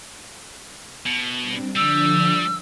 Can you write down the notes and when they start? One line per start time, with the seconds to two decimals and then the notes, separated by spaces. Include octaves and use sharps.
1.06 B2
1.39 G3 C4 D4
1.75 D3 F3 G3 D4 E6